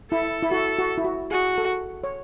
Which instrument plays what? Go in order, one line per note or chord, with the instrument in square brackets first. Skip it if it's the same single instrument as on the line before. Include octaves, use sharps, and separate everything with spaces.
[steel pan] E4 [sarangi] A4
[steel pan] E4
[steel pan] F#4 [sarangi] A4
[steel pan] F#4
E4
F#4
[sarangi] F#4 [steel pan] G#4
[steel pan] A4
C#5